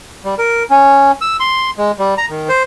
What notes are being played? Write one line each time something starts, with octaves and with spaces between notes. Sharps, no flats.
G3
A#4
C#4
E6
C6
G#3
G3
A#5
D#3
C5